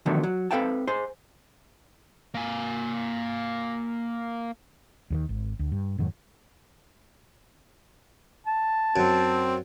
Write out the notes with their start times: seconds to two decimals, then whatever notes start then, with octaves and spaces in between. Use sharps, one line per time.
0.06 E2 D3 D#3 F3 F#3 A3
0.23 F#3
0.51 C4 A4 B4 F5 G5 A5
0.87 G#4 C5 G#5
2.35 A#3 G#5
5.10 D#2 D3 D#3
5.29 G#1
5.59 D2
5.72 G2
5.98 F2 G#2 D#3 F#3
8.46 A5
8.96 F#2 C4